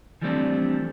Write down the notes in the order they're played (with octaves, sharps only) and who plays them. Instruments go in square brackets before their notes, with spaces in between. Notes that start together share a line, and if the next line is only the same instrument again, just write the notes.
[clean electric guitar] E3 F3 G3 A3 C4 D4